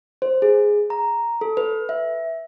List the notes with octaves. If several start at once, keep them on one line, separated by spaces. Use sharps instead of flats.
C5
G#4
A#5
A4
B4
E5